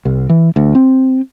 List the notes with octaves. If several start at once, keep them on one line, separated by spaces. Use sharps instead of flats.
C2
E3
D2
C4